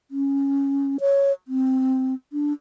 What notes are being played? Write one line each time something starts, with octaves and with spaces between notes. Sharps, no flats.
C#4
C#5
C4
D4